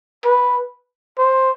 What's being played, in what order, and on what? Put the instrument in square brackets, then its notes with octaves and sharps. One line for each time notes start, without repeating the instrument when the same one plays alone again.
[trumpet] B4
C5